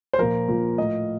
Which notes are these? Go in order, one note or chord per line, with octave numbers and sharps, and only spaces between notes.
C5
A#2 F3 A#4
A#2 F3
A2 F3 D#5